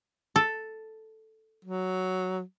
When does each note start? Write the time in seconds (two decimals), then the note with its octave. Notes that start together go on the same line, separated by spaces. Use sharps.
0.36 A4
1.65 F#3